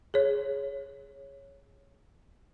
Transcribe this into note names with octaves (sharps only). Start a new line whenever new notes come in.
G#4 C#5